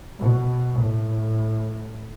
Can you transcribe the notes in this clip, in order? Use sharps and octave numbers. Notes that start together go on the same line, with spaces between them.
B2
A2